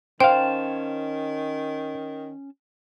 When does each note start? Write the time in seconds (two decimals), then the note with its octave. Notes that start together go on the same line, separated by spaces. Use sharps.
0.20 D#3 C#4 C5 C#5 F5 G5 A5